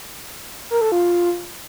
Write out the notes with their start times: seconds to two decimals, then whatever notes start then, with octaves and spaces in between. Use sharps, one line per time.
0.70 A#4
0.81 A4
0.92 F4